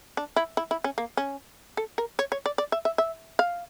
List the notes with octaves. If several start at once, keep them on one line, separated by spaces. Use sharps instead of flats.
D4
E4
E4
E4
C#4
A#3
C#4
A4
A#4
C#5
C#5
D5
D5
E5
E5
E5
F5